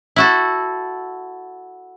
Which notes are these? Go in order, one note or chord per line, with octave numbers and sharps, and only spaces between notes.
E4 F#4 A4